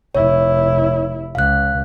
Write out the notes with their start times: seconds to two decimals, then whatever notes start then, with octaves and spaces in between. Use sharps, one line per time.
0.15 F1 E4 C#5
1.35 C#2 F5 F#6